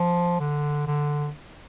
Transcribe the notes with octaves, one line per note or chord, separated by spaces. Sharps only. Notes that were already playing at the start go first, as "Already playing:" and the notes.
Already playing: F3
D3
D3